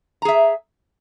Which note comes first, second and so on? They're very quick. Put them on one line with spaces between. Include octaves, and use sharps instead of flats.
A#5 G#4 E5